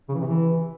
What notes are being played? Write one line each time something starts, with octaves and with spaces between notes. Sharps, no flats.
C#3
E3
C3
E3